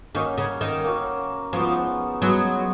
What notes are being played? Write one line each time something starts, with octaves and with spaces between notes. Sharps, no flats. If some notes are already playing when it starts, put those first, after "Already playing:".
D#3 A#3 C#4 F#4
C#3
D#3
A#3 C#4 F#4
F3 G#3 B3 D#4 F#4
F#3 G#3 B3 D#4 F#4